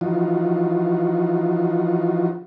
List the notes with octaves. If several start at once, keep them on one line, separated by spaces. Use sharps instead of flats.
E3 F3 D#4 F4 F#4